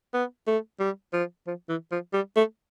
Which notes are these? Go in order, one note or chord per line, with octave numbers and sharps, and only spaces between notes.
B3
A3
G3
F3
F3
E3
F3
G3
A3